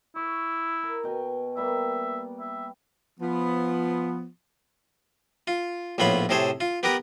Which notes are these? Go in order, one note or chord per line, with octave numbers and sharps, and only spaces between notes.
E4 C#6
A#4
B2 G5 G#5
G3 A#3 B3 E5
E5
F3 B3
F4
A#1 A2 B3 F4 C#5 B5
A2 C3 G#4 A4 C5 C#5
F4
B3 G4 A#4 B4 A#5